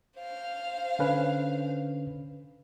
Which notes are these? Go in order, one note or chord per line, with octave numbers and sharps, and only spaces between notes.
C5 F5
D3 C#4 B4